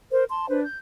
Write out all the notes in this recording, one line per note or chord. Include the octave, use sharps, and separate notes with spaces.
A#4 C5
A5 C6
D4 B4 C5
G6